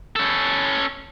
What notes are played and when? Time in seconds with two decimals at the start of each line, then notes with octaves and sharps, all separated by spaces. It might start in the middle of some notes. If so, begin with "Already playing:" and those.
0.16 C#4 A4